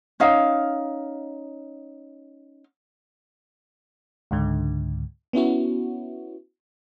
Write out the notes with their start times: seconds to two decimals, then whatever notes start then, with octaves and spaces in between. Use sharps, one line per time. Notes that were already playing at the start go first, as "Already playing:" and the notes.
0.20 C#4 D#4 F5
4.31 C#2 G#2 D3
5.33 B3 C#4 E4 F#4